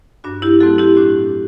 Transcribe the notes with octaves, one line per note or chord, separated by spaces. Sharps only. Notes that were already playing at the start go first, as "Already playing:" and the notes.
G2 D4 F#4
E4 G4
F#3 A3 C4 F#4 A4
E4 G4
A2 D4 F#4